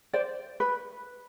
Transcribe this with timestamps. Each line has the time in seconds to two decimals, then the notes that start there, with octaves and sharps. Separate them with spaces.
0.13 C5 D5
0.60 B4